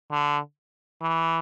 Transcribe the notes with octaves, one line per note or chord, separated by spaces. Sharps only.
D3
E3